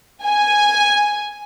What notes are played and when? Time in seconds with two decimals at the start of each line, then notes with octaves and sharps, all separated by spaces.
0.24 G#5